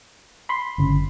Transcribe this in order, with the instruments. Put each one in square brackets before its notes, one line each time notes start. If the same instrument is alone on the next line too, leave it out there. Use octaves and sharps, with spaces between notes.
[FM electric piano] B5 C6
[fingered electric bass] G1 C#3